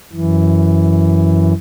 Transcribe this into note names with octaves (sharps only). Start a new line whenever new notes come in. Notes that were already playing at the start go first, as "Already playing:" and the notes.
F#2 E3